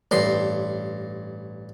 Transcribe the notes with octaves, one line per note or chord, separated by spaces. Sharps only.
A1 G2 C6